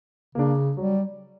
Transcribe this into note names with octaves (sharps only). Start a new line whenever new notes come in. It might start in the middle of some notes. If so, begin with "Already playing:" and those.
C#3 A#3 D4
F#3 G3